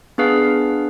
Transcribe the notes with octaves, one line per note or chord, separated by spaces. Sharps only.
B3 D4 G#4 B4 F5